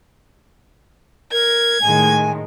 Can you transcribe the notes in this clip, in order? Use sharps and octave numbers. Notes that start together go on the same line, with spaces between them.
A#4 G#6
A2 D#3 G#3 G#5